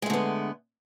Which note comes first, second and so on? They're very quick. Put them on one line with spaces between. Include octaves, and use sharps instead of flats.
G#3 A3 D3 B3